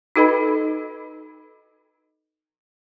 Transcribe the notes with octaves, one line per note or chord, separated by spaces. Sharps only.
D#4 F#4 A4 B4 D#5 B5